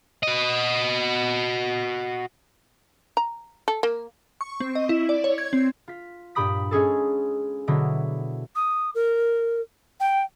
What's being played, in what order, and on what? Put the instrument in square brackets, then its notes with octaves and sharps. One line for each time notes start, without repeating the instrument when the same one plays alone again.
[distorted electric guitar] F#4 D#5
[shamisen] A#5
A4
A#3
[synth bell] C#6
C4
D#5
E4
D5
C#5
G#6
C4
[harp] F4 B6
G2 A#2 G4 B5 D#6 B6
G#3 C#4 G#4 A4
B2 D3 F#3 E4
[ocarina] D#6
A#4
G5